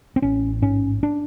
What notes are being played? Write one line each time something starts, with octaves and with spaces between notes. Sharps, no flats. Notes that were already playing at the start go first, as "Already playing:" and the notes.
C4
A1 C#4
G#2 C#4
D4